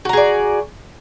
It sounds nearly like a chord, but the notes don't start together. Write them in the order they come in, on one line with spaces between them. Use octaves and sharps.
F#4 A#5 G#4 D5